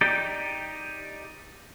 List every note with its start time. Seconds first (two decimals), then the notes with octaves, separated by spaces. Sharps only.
0.01 D#4 G4 D5 G5